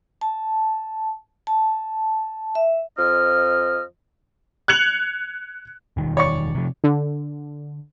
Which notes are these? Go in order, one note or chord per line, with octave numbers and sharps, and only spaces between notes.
A5
A5
E5
F2 F3 D#5 F6
F#6 G#6 C#7 F7 F#7
E1 D#3
C#5 D5 C#6
C3 F3
D3